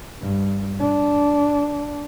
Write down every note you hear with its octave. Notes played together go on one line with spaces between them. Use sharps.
G2
D4